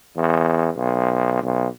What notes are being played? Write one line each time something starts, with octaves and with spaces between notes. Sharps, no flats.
E2
B1
B1